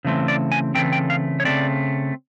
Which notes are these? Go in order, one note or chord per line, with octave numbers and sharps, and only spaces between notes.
C#3 E3 A3 C4
D5
G#5
C#3 E3 A3 C4 G5
G5
F5
C#5
C#3 E3 A3 C4 D5